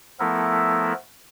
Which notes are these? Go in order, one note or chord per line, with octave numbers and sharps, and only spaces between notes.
F3 A3 B3 E4 A4 A#4